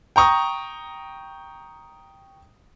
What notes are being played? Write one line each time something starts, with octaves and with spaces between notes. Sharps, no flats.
G5 A#5 C#6 D#6